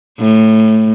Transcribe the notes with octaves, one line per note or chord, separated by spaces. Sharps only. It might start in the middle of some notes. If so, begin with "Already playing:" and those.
A2